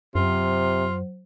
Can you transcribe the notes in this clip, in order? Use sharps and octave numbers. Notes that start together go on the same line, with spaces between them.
F#2 C3 F#3 F4 C5